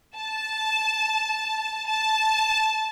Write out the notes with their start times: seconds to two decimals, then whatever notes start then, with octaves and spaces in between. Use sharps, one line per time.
0.16 A5
1.89 A5